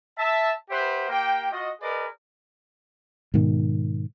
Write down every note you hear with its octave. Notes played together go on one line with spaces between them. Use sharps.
E5 A5
G4 B4 C5 E5 F#5
A#3 G4 G5
F4 F#4 D#5
G#4 A#4 B4 D5 D#5
G#2 B2 D#3